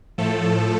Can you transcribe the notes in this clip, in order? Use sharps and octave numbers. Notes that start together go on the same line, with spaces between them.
A2 F3 A3 A4